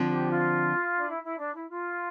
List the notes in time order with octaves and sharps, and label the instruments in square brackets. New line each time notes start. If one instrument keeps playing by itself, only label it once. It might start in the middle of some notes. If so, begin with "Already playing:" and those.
Already playing: [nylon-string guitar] D3 F3 C4
[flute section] G4
F4
D4
E4
E4
D4
E4
F4